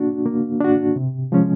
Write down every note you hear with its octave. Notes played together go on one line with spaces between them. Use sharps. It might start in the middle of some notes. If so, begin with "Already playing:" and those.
Already playing: A#3 D4 F#4
A#3
D4 F#4
C3
F3 G#3 C#4